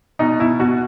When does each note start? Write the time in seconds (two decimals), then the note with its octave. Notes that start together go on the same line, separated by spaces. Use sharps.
0.19 B2 D#4
0.39 B2 E4
0.59 B2 F#4